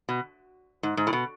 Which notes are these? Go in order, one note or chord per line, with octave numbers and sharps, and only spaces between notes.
B2
G#2
G#2
A2
B2